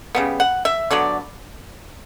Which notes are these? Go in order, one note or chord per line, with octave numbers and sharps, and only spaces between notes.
C#3 G3 B3
F#5
E5
D3 F#3 B3 D5